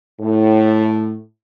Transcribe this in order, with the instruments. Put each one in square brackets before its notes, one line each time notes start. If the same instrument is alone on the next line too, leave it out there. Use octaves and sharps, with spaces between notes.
[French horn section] A2